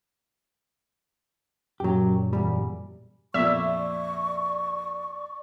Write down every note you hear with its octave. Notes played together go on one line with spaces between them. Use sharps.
F#2 A#2 F#3 G4
E2 G3
F2 A#2 D5 E5 C#6